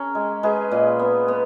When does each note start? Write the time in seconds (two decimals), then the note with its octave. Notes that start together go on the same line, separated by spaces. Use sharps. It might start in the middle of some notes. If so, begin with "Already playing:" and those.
Already playing: C#4 G#4 A#4
0.15 G#3
0.43 G#3 G#4 B4
0.71 A#2
0.99 B3
1.28 B3